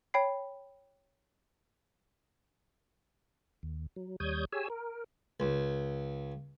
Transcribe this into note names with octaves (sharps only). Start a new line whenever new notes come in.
C#5 G5 B5 C7
D#2
F#3
D#2 G3 C#5 D#6 G6 G#6
G4 G#4 C#5 G#5 E6
A#4
C#2